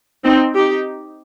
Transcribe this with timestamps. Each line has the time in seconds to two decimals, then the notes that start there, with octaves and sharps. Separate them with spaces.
0.24 C4 D#4
0.55 D#4 G4